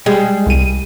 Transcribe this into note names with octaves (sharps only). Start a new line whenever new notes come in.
G3 G#3
C2 D#7